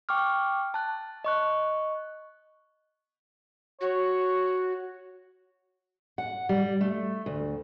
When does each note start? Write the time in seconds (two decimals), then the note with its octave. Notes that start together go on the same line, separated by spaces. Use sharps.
0.09 G5 C#6 D6 F6
0.74 A5 F#6
1.24 D#5 C#6 F#6
3.81 F#4 C#5
6.18 F#5
6.49 G3
6.81 A3
7.26 D2